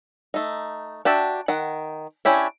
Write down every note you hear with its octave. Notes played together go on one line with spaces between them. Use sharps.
A3 D#4
D4 F#4 G4 E5 A5
D#3 F#5
C#4 D4 E4 G4 C#5